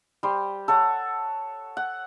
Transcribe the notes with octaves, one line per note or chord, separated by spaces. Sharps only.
G3 C5
A4 C#5 F#5
F#5